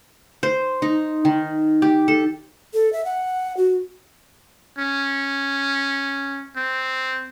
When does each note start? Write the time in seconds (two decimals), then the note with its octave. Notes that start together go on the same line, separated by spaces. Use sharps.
0.43 C5
0.82 D#4
1.25 D#3
1.82 G4
2.08 A4
2.74 A4
2.93 E5
3.05 F#5
3.57 F#4
4.78 C#4
6.56 C4